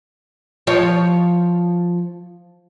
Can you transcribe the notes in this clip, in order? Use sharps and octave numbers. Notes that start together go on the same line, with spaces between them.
F3 C#5